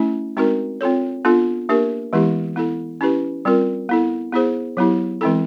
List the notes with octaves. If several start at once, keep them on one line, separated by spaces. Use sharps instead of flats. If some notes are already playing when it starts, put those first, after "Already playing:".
Already playing: A3 C#4 E4
G#3 C4 D#4 F#4 A#4
C4 F4 A4 C#5
B3 D4 F4 A4
A#3 D4 G4 A#4
E3 G#3 B3 E4 G4
B3 E4 A4
C#4 E4 G4 B4
G3 C4 F4 A#4
B3 E4 A4
B3 E4 G#4 C5
F#3 B3 E4 G4
E3 G#3 C4 E4 A4